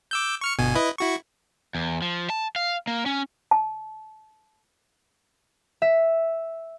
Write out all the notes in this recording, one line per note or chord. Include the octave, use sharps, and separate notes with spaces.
D6 E6 G6
C#6 F6 C#7
G1 B2 G#5
E4 B4 D#5
E4 F#4 C#6
E2
F3
A5
F5
A#3
C#4
A5
E5